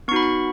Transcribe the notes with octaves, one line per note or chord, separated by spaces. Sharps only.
B3 D#4 F#4 B5 C#6
C#6